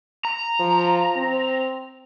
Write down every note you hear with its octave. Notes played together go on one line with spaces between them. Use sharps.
A#5
F3
C4